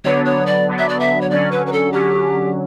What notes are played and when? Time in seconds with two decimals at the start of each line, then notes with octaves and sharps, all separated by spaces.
0.04 D3 F#3 B3 D4 C#5
0.25 C#5
0.46 D5
0.67 D3 F#3 B3 D4
0.79 E5
0.89 D5
1.00 E5
1.21 C#5
1.30 D3 F#3 C#4 D5
1.52 B4
1.66 B4
1.73 A4
1.93 D3 F#3 C#4 G4